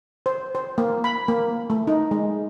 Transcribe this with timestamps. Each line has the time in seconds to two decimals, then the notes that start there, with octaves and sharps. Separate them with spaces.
0.26 C5
0.55 C5
0.78 A#3
1.04 B5
1.28 A#3
1.70 A3
1.87 D#4
2.11 G#3